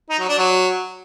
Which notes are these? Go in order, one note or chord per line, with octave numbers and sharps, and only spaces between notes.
D#4
F#3
D4
F#3